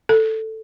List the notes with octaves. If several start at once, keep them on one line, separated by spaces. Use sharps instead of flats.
A4